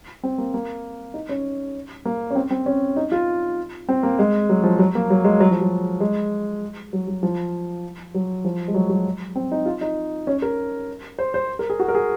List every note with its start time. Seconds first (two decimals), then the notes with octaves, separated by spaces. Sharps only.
0.23 C4
0.38 A#3
0.54 A#3
1.14 D#4
1.29 C#4
2.05 A#3
2.30 C#4
2.35 C4
2.51 C4
2.66 C#4
2.96 D#4
3.12 F4
3.89 C4
4.03 A#3
4.19 G#3
4.49 F#3
4.64 F3
4.79 F#3
4.95 A#3
5.10 F#3
5.24 G#3
5.40 F#3
5.51 F3
5.61 F#3
6.00 G#3
6.93 F#3
7.07 F#3
7.23 F3
8.14 F#3
8.45 F3
8.68 G#3
8.74 F#3
8.90 F#3
9.36 C4
9.52 D#4
9.66 F4
9.81 D#4
10.27 C#4
10.42 A#4
11.19 C5
11.34 C5
11.59 A#4
11.70 G#4
11.80 F#4
11.88 A#4
11.95 G#4